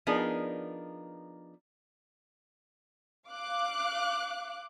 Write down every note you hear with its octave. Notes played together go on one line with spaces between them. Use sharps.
F3 B3 D4 D#4 G#4 A#4
F5 D6 F#6